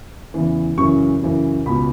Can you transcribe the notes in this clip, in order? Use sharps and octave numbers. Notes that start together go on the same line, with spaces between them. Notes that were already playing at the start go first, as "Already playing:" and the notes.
E2 C#3 E3
F#2 C#3 E3 C#6
F#2 C#3 E3
C#2 B2 B5